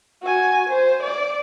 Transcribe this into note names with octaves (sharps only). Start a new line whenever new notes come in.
F#4 G#5
C5
D5